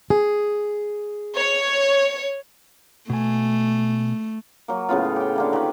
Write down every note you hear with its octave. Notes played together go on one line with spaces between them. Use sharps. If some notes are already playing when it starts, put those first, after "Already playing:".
G#4
C#5
B2 A3 G#5
F#3 A#3
A2 C#3 B3 F4
A4
G4 G5
D3 A#3 E4
D#3 G4 B4